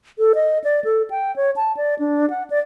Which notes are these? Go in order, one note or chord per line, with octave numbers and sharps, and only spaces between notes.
A4
D#5
D5
A4
G5
C#5
A5
D5
D4
F#5
D5